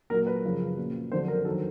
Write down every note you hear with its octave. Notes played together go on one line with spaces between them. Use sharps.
A#2 F#3 A#4
B4
F#2 C#3 F3
A#2 F#3
F2 D3 F#3 C5
A#4
F#2 D#3 F#3 A4